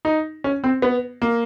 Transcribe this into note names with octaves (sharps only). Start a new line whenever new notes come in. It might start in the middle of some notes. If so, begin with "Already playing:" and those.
D#4
C#4
C4
B3
A#3